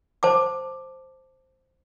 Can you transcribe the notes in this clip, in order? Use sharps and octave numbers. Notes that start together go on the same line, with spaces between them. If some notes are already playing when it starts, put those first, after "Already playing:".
C5 A5 D6